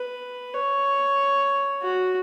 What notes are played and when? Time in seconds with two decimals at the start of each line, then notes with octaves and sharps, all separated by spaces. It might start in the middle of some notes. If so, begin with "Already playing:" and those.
Already playing: B4
0.54 C#5
1.82 F#4